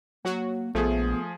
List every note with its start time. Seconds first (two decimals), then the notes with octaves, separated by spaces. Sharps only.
0.25 F#3 A#3 F#4
0.75 A#1 F3 A3 B3 G#4